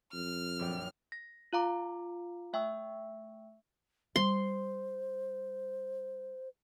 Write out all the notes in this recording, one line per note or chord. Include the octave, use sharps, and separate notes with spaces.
F2 F6
A#1 F#2 G5
A#6
F4 F5 A#5 D6
A3 E5 G5 C#6 E6
G3 C5 C6